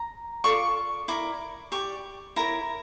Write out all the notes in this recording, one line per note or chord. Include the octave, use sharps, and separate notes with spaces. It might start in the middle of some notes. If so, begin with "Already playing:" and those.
Already playing: A#5
F4 A4 D5 C#6
E4 A#4 D5 D6
G4 D5 C#6
E4 A#4 C#5 A#5